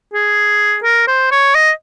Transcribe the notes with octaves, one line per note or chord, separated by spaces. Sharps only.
G#4
A#4
C5
C#5
D#5